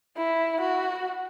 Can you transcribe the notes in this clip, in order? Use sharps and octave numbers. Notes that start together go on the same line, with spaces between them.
E4
F#4